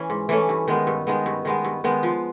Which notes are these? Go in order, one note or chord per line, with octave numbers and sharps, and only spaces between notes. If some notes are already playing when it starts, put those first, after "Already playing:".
Already playing: E3 C#4
G#2
E3 A3 C#4
G2
D#3 G#3 B3
G2
D#3 G#3 B3
G2
D#3 G#3 B3
G2
D#3 G#3 B3
F3